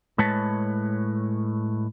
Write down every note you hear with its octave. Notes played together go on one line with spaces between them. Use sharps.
A2 G#3 B4 C#5 A5